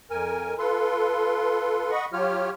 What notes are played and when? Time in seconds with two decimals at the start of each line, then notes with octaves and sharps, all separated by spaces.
0.10 F2 A#4 G#5
0.59 F4 A4 B4 C6
1.91 D#5 F#5 B5 C#6
2.13 F#3 F4 G4 C#5 F6